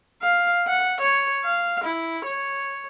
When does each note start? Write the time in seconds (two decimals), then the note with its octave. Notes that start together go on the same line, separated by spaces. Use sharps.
0.22 F5
0.68 F#5
1.01 C#5
1.44 F5
1.84 E4
2.26 C#5